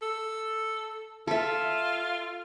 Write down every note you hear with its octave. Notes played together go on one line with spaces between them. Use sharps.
A4
F4 A4 E5